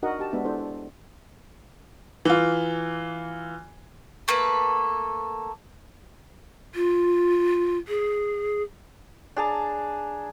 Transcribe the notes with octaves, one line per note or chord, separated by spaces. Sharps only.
D4 D#4 F#4 A#4 D#5 F#5
G4 A5
G#3 B3 D4 F#4 B4 E5
D4 E4 A4 C5
E3 F4
A3 A#3 A4 B4
F4
G#4
D4 G#4 A5 A#5